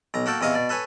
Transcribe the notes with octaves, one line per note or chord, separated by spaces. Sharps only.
B1 A#5
A#3 F#4 A4 G5
E2 C3 D#5 F5 C#6
B2 D5
A4 B4 C#5 G#5